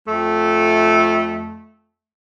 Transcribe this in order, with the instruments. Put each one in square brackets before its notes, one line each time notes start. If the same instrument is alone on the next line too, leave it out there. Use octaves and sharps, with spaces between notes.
[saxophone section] F2 A3